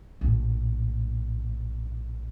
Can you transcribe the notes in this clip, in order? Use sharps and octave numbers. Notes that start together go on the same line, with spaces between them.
A#1 A2